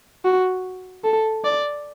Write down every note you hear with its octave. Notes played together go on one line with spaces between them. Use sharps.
F#4
A4
D5